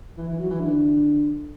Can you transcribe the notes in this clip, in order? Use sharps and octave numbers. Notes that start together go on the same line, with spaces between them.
E3
E3
F#3
E3
D3